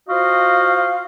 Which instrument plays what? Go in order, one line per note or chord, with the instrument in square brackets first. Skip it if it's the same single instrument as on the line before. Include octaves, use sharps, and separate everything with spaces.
[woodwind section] F4 F#4 C5 D#5 F5